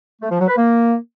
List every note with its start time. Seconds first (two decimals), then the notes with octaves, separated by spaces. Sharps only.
0.22 A3
0.30 F3
0.39 F#3
0.48 B4
0.57 A#3